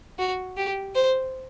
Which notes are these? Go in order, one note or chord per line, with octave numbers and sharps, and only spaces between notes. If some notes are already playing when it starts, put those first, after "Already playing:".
F#4
G4
C5